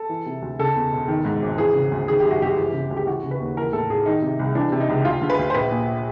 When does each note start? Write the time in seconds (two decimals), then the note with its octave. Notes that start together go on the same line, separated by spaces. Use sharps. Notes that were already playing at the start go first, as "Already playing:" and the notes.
Already playing: A4
0.09 E3
0.26 C3
0.42 D2
0.59 C#3 A4
0.75 E2
0.92 E1
1.08 D#3
1.25 G#2
1.42 G#1
1.58 E3 G#4
1.74 C#3
1.92 D2
2.08 D#3 G#4
2.20 G4
2.25 F#2
2.31 F#4
2.41 G1 G4
2.57 E3
2.73 C#3
2.91 D2
2.97 G4
3.07 E3 F#4
3.24 C#3
3.31 B4
3.40 D#2
3.57 E3 A#4
3.73 A2 A4
3.90 A1 G#4
4.06 D#3 D#4
4.22 C3
4.39 C2
4.55 E3 D4
4.72 C3
4.80 D#4
4.90 C#2
5.05 D2 F4
5.22 D3
5.30 B4
5.39 D2
5.50 C5
5.54 A#1 B4
5.71 A#2